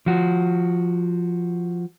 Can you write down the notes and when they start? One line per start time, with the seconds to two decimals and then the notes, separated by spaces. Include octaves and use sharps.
0.06 F3 F#4